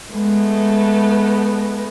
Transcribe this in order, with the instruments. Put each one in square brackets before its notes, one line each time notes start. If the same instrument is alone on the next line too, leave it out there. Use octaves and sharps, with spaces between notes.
[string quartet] G#3 A3 B3